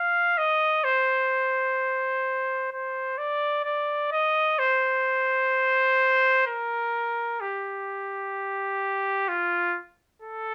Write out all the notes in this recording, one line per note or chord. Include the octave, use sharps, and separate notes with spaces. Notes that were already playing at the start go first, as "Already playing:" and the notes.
Already playing: F5
D#5
C5
C5
D5
D5
D#5
C5
A#4
G4
F4
A4